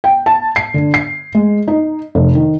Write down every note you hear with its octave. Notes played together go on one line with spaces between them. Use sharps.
G5
A5
C7
D3
C7
G#3
D#4
F1
D#3